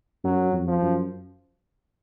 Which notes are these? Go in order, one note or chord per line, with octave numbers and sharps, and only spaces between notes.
F#2 F#3
F2
F3
F#2